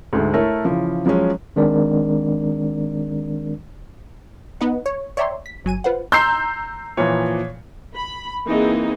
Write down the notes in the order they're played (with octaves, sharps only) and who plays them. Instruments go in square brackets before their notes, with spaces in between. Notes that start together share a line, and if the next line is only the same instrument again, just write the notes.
[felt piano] D2 G#2 G#3 A3
A3 E4 A4 A#4 C#5
C#3 E3 F3
F3 F#3 G#3 C#4
[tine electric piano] D#3 G#3 C4 D4 A#4 D5
[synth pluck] B3 D#4 B4 D#5 F#5
C#5
C#5 D5 E5 G5 A#5 C6
B6
G1 F#3 G#5 D#7
F4 B4 C5 F#5
[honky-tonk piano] A#5 E6 G6 [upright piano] C6 C7
[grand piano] A#2 E3 F3 [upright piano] C#5
[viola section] B5
E3 A#3 C4 D#4 G#4